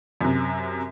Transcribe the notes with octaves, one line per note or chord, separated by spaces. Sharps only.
F#2 C3